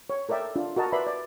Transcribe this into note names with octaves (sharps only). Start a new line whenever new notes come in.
C#5
A4 A#4 D5 E5 G5
D4 F4
F#4 A#4 D#5 A5 A#5
B4 D5 E5 B5 C6
D5